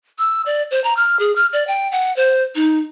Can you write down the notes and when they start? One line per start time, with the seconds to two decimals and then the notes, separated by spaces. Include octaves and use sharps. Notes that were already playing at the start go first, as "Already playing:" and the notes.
0.19 E6
0.46 D5
0.71 C5
0.84 A#5
0.97 F6
1.19 G#4
1.36 F6
1.53 D5
1.67 G5
1.92 F#5
2.16 C5
2.55 D#4